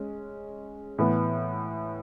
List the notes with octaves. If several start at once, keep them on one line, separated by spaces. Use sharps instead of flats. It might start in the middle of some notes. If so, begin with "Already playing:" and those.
Already playing: G#3 C#4
A2 E3 B3